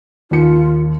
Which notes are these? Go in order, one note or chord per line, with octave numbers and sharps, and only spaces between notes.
D#2 F4 C#7